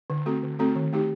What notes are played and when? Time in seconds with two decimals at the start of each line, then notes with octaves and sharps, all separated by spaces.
0.10 D3
0.26 A3 C4 F#4 A4
0.43 D3
0.59 A3 C4 F#4 A4
0.75 D#3
0.93 A3 D#4 G4